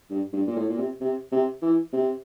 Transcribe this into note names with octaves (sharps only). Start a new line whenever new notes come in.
G2
G2
A#2
A2
A#2
C3
C3
C3
E3
C3